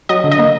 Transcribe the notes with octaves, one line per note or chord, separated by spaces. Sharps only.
F#3 D#5
D3
D#5
A#3